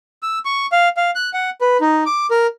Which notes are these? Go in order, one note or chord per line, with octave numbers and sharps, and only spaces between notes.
E6
C#6
F5
F5
F#6
F#5
B4
D#4
D6
A#4